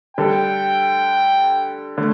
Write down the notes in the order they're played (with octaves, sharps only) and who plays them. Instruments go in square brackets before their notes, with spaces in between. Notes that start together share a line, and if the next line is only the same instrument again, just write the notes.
[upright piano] D3 G3 D4 A4 [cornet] G5
[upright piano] D3 A3